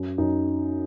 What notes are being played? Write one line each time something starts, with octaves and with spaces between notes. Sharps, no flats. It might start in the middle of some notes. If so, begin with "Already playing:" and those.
Already playing: F#2
F#2 D#4